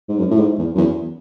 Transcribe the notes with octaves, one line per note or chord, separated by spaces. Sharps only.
G#2
F#2
A2
G#2
E2
F#2
E2